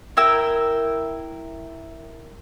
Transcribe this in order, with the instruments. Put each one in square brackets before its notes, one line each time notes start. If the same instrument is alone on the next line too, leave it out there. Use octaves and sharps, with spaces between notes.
[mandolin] E4 A#4 G5 E6